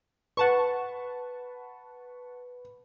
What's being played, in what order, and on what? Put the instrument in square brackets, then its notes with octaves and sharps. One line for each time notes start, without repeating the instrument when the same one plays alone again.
[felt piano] B4 [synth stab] F#5 A5 C#6